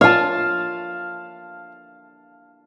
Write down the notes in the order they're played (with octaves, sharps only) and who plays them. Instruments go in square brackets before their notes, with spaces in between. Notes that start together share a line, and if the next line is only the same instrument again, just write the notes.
[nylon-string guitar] F4 C#5 [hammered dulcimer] F5 A5